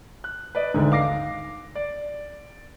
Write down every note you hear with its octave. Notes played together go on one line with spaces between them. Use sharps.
F#6
B4 D5 D#5
G#1 D2 G#2 D3
F5 D6 A#6 C7
D5